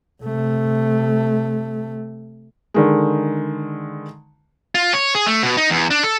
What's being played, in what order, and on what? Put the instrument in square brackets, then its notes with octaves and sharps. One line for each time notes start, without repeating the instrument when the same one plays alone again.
[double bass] C3 A3
[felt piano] D3 D#3 G#3
[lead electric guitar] F4
C#5
G#4
A3
B2
D#4
E2
D4
A4